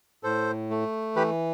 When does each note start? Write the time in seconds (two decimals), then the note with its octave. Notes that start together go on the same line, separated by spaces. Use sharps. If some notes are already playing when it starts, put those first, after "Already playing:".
0.23 A2 A4 C5
0.70 A3
1.16 E3 G4 B4